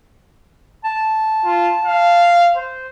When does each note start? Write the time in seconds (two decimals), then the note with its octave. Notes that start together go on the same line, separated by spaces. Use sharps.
0.84 A5
1.44 F4
1.85 F5
2.56 C5